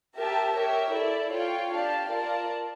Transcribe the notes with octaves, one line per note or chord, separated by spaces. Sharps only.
G4 A#4 E5 A5
G4 A#4 C#5 E5
E4 A4 D5
F4 C#5 G5
D4 G4 D5 F5 A5
F4 A#4 D5 A5